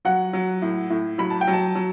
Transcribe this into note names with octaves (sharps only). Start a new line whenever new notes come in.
F#3 F#5
F#3
A2
A2
F#3 B5
A5
G5
F#3
A5
F#3